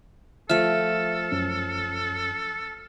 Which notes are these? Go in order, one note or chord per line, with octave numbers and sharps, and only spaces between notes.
F3 A3 A4 E5 F6 E7
F#2 C#4